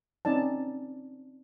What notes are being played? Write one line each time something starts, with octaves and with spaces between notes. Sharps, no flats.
C4 C#4 D#4 D5 A5